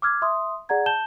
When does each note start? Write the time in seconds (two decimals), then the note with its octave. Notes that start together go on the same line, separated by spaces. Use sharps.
0.02 D6 E6 F6 G#6
0.22 E5 C6 D#6
0.69 G#4 D5 F#5 A#5 G#6
0.86 A5 G6 E7 G7